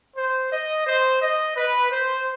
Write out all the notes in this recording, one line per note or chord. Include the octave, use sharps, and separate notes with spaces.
C5
D#5
C5
D#5
B4
C5